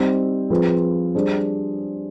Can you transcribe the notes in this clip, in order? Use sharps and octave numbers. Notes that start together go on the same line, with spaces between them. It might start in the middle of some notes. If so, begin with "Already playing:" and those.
Already playing: G3 C4 D#4
F3 C4 F4 G#4 B4
G3 D4 G#4 C5